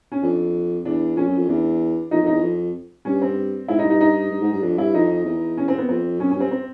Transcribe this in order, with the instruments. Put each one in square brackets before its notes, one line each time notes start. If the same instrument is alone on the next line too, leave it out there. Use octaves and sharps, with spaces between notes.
[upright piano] C#4
[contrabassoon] F2 [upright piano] D4
[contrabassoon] E2 [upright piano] D4
[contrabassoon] F2 [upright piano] C#4
[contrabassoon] F#2
F2
[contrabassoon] E2 [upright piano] D4
[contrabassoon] F2 [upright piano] D#4
[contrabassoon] F2 [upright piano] D#4
[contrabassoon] E2
F2
[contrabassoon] G2 [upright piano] C#4
[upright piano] C4
[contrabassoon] G#2 [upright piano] E4
[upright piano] D#4
[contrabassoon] G2
[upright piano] D#4
D#4
[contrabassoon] G2
G#2
G2
[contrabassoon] F2 [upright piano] D4
[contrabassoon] G2 [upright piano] E4
[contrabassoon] F2 [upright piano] D#4
[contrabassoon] E2
[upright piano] C#4
C4
B3
[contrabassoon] F2 [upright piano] C4
[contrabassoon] F#2 [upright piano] C#4
[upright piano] C#4
[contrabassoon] G2 [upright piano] C4
[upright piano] C4